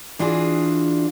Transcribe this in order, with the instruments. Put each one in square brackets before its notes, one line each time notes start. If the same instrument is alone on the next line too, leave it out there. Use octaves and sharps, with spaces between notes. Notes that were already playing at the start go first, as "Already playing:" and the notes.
[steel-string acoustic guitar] E3 D4 F4 F#4 G#4